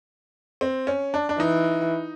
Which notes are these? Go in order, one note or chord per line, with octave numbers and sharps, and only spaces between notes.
C4
C#4
D4
D4
E3 D#4